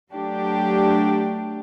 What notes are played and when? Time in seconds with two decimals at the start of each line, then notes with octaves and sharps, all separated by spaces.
0.10 F#3 A3 D4 G4